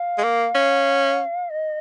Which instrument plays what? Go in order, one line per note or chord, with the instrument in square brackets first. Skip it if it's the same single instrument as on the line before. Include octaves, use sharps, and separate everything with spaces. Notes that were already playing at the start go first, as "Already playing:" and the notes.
Already playing: [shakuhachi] F5
[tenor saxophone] G#3
A#3
C#4
[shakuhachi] D#5